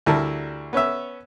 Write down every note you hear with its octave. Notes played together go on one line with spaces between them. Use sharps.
D2 G3 E4 A#4 A5
B3 C#4 C#5 E5